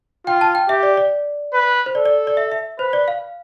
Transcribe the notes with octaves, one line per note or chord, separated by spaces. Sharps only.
F4 G5
A5
G5
G4 E5
D5
D5
B4
C5
A4 D5
D5
D5
E5
E5
B4 C5
D5
F5